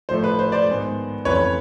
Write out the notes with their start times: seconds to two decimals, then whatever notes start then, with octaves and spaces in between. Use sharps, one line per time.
0.09 A2 F3 A3 C5
0.24 B4
0.39 C5
0.52 C5 D5
0.67 G#2 D#3 G#3 B3
1.25 F2 C#3 E3 A3 C4 B4 C#5